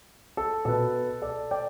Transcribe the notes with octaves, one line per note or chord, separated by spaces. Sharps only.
A4
B2 B3 A4
A4 D5
D5 G5